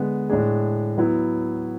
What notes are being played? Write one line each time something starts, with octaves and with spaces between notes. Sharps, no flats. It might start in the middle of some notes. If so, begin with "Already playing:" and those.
Already playing: D3 G#3 B3
A2 G#3 D4 G#4
F#3 B3 E4